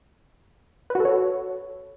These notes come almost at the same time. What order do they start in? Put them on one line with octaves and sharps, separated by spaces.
B4 F#4 A4 C#5